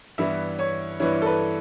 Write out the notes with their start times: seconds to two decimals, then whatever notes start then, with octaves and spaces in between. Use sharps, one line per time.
0.18 G2 E3 B3 E4 E5
0.59 C#5
1.00 G2 E3 B3 E4 C#5
1.22 A4
1.26 B4